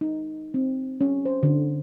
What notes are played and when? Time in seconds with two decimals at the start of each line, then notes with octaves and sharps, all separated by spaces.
0.01 D#4
0.54 C4
1.01 C#4
1.25 C5
1.43 D3